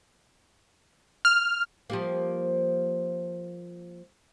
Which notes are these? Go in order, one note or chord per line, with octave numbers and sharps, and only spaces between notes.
F6
F3 G3 A#3